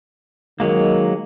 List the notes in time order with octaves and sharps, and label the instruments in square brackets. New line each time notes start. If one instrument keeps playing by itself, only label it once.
[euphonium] D#3 [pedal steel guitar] F#3 G#3 A#3